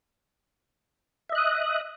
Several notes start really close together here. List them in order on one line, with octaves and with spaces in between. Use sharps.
E5 D#5 F#6 D#6